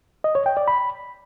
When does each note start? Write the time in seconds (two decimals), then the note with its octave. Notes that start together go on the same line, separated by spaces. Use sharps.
0.24 D#5
0.35 C#5
0.46 G5
0.57 D5
0.68 B5